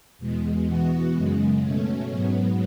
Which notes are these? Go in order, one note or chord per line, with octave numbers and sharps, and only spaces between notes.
E2 B2 G#3
E3 B3 F#4
F#2 C#3 G#3
B2 A3 C#4
G#2 F#3 B3